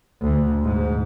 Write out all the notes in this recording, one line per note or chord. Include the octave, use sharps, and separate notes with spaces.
D2
G#2